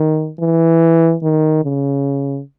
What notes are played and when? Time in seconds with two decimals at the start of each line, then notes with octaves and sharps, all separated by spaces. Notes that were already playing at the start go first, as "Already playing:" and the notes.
Already playing: D#3
0.39 E3
1.23 D#3
1.65 C#3